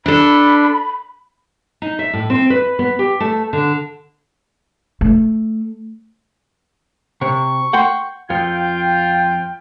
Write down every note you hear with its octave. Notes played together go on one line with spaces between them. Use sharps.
D4 A4 B5
D#4
E5
A2
C4
B4
B3
G4
A3
D3
A3
C3 C#6
F#5 G5 C6
F2 F4 G5 G6